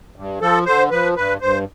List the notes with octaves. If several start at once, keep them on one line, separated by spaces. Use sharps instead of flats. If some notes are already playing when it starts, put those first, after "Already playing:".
G2
F3 A4
D3 C5
F3 B4
G2 B4
G2 C5